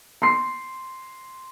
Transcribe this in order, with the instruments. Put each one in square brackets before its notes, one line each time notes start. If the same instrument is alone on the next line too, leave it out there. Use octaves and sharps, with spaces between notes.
[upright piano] C6 C7